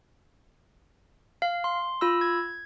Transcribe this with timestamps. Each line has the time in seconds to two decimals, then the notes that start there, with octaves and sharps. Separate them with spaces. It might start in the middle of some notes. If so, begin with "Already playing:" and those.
1.42 F5
1.64 C6
2.01 F4 B5 E6
2.21 G#6